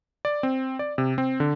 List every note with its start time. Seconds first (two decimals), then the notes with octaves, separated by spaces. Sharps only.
0.25 D5
0.43 C4
0.79 D5
0.98 C3
1.18 C4
1.40 D3